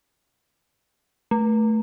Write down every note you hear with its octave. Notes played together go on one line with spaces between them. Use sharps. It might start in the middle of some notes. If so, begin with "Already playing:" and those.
A3